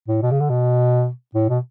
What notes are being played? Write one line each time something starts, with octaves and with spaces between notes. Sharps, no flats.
A2
B2
C#3
D3
B2
A2
B2